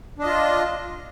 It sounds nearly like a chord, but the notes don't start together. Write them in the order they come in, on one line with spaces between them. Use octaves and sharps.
D4 D#5 F4